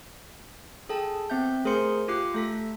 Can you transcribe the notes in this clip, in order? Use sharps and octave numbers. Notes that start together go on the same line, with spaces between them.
G#4 A4 G5 A5
B3 C4 E5 G6
A3 G#4 A#4 C5 C6 C#7
F4 G4 D6 F#6 C7
A3 A4 B6